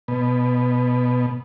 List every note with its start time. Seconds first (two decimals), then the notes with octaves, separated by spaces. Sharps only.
0.08 B2